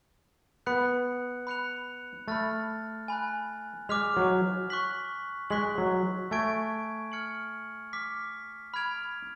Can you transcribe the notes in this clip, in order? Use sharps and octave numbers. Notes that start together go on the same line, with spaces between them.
B3 B5 F#6 C#7
B5 F#6 C#7 F7
A3 B5 F6 A6
G#5 B5 F#6
G#3 D6 F6 B6 F7
F#3
C#6 F#6 B6 F#7
G#3 C#6 F#6 B6 F#7
F#3
A3 G#5 C#6 G#6 D7
F6 G#6 C#7 F#7
D6 F6 B6
B5 F6 G#6 D7 F7